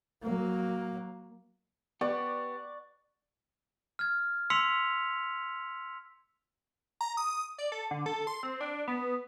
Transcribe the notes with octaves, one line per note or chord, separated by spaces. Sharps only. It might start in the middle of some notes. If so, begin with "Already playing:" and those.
F#3 A#3
B3 G4 D5 F#5 C#6
F6 G#6
C6 E6 B6 C#7 F7
A#5
D#6
D5
A4
D3
A4
C6
C4
D4
B3